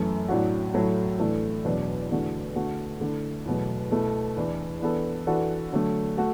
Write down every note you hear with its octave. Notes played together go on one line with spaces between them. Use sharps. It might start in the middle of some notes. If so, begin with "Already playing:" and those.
Already playing: F#2 E3 A3
A2 F#3 D4 F#4
A2 F#3 A3 E4 A4
A2 E3 A3 D4 A4
E2 B2 F#3 B3 D4
E2 D3 A3 F#4 A4
D3 A3 F#4
D3 A3 E4 A4
E2 B2 F#3 A3
B2 A3 E4 A4
E2 E3 D4
E3 B3 D4 A4
E3 D4 F#4 A4
D3 F#3 A3
A3 F#4 A4